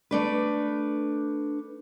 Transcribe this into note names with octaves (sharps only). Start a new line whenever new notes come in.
A3 D4 B4